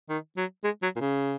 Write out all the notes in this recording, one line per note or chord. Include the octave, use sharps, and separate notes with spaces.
D#3
F#3
G#3
F#3
A#2
C#3